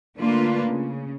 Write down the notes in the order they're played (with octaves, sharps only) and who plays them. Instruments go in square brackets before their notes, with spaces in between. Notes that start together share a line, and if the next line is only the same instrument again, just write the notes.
[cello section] D3 A3 A#3 D4 F4 B4
C#3